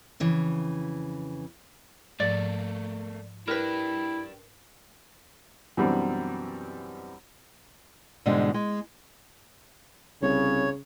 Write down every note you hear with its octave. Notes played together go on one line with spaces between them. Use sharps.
F2 C#3 E3
G#2 F3 A3 A#3 D5
D4 E4 G4 A#4 B4
F#2 B2 E3 G3 C4 D4
G#2 B2 D3 E3 G3 G#3
G#3
C2 C#3 C#5